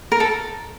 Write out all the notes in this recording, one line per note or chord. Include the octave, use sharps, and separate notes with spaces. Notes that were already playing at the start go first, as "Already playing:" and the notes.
A#4
A4